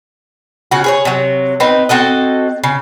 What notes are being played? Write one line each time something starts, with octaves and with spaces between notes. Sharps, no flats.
C#3 F#4
G#4 B4 C#5
C3 F#3
C4 D#4 B4
C4 F#4 A4 D#5
C#3